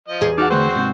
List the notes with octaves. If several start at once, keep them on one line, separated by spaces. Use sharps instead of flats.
F3 D#5
E2 G#4
D#4 F#4 F#5 A5 D6 F6
D3 A3 C4 F#4 B4 C5
G#2 C3